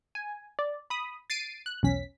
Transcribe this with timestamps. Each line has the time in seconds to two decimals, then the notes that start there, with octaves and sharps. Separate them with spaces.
0.15 G#5
0.59 D5
0.90 B5 D#6
1.30 A6 C7 D7 D#7
1.66 F#6
1.83 B1 E2 C#4 B6